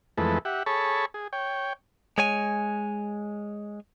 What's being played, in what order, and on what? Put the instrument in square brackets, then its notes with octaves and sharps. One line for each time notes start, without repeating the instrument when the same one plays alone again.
[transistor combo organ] F2 E3 G#3 A3 A4 B4
G4 E5 F#5
G#4 A4 C#5 A5 B5 C#6
G#4
C#5 G5
[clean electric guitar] G#3 C#5 G#5